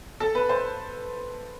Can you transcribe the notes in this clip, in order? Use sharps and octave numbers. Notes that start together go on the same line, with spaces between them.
A4
B4
C5